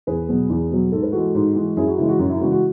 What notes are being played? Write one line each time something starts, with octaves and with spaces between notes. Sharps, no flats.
E2 G#4 B4
B2 F#3
E2
B2 F#3
G#2 A4
B4
E3 G#3 F#4 A4
G#2
E3 G#3
F#2 E4 G#4
F#4
C#3 E3 G#3 E4
F#4
F#2 F#4
E4
C#3 E3 G#3 F#4
F#4